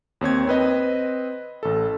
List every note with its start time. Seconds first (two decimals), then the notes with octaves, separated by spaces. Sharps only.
0.21 D#2 C4 C#5 G#6
0.48 C4 B4 D#5
1.63 A1 A4